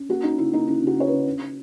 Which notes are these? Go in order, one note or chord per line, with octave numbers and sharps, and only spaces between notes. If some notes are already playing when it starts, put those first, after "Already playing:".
Already playing: C#4
A#3 F#4
C#4 D#4
C#3 E4
A#3 D#4
C#3 E4
C#3 F#4
C#4 C#5
C#3 B4
C#3
C#4